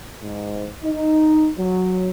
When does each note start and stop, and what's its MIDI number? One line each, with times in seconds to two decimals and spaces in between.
0.21 0.68 44
0.84 1.49 63
1.57 2.10 54